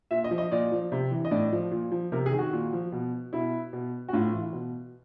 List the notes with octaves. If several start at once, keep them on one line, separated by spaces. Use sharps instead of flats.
A#2 E5
D#5
F3
D#5
A#2 D5
F3
C3
E3
D#5
A2 D5
F3
A#2
F3
C3 A#4
G#4
D#3
F#4
A#2
F3
B2
B2 E4
B2
F#4
A2 F4
E3
B2